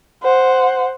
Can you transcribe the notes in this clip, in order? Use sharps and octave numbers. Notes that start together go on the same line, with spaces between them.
C5 F#5